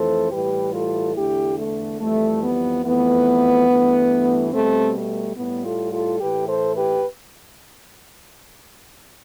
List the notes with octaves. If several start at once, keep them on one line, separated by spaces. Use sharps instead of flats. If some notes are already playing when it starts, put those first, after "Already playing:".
Already playing: F2 E3 A3 A4 C5
A2 E3 G3 G4 B4
F4 A4
E2 D3 A3 E4 G4
A3
F2 E3 G3 A3
B3
F2 E3 A3 B3
G2 E3 A3
B2 G3 A3 C4
A3
A2 G3 B3
F4 A4
F4 A4
A2 E3 A3 G4 B4
A4 C5
G4 B4